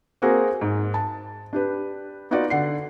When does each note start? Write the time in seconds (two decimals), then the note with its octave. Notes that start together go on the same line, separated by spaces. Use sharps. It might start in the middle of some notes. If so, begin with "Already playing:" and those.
0.22 A#3 C4 F#4 G#4 A#4
0.61 G#2
0.94 A5
1.53 D4 G4 B4
2.31 B3 D#4 F4 F#4 D5
2.50 D3 F#5 C7